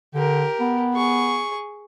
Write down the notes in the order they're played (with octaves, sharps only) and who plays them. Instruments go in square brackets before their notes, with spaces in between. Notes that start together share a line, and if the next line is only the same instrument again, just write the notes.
[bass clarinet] D3 [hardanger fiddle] G4 A#4
[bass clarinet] B3
[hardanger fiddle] G#4 C#6